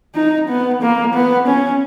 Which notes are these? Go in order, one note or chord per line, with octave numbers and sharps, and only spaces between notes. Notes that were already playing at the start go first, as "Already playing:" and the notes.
D#4
B3
A#3
B3
C#4